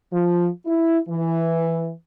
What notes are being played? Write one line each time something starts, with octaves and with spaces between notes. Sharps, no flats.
F3
E4
E3